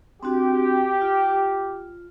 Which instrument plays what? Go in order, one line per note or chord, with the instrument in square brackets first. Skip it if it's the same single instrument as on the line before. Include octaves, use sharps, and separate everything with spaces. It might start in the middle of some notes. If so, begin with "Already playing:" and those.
[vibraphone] C4 D4 F#4 [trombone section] G4
[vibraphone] F4